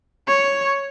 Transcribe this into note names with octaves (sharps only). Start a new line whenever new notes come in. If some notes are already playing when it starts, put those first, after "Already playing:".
C#5